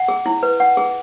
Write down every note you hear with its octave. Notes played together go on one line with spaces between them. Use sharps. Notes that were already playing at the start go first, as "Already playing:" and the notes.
Already playing: F#5
G#4
E4
B4
F#5
G#4